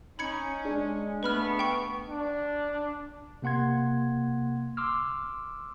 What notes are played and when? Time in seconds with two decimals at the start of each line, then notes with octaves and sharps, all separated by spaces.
0.19 C#4 D#4 B5 G#6 C#7
0.65 G#3 D4 G#4
1.23 A3 B3 B4 B5 F6
1.59 G5 C#6
2.09 D4
3.42 C3 A#3 F#5 C6 G#6
4.77 C6 D6 E6 F6